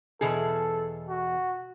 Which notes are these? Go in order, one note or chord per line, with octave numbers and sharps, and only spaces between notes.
E2 B2 G#4 A4
F#4